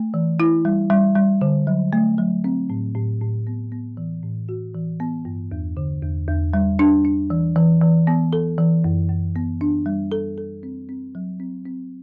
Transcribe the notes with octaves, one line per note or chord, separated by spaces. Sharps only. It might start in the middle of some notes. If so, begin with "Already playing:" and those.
Already playing: A3
E3
E4
G3
G3
G3
D3
F#3
A3
F#3
C4
A2
A2
A2
B3
B3
E3
A2
F#4
E3
B3
G2
E2
D3
E2
E2
G3
D4
D4
E3
E3
E3
B3
A4
E3
F#2
F#2
B3
D4
G3
A4
A4
C4
C4
F#3
C4
C4